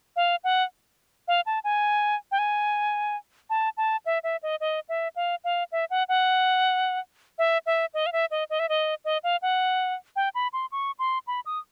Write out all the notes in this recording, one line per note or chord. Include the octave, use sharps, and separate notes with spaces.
F5
F#5
F5
A5
G#5
G5
G#5
A5
A5
E5
E5
D#5
D#5
E5
F5
F5
E5
F#5
F#5
E5
E5
D#5
F5
E5
D#5
D#5
E5
D#5
D#5
F5
F#5
G5
B5
C6
C#6
C6
B5
D#6